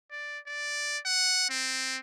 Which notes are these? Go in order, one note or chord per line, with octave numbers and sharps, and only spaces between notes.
D5
D5
F#5
C4